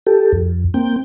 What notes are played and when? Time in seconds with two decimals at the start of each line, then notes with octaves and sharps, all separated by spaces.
0.07 G4 A4
0.33 F2
0.74 A#3 C4 G5